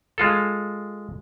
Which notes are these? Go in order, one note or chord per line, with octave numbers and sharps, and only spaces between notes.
G#3 F4 A4